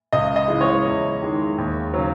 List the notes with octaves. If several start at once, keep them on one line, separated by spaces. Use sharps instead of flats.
C#2 D#5
D#5
C#3 E3 G#3
C#5
E2
D#3 G#3
D#2
C#3 F#3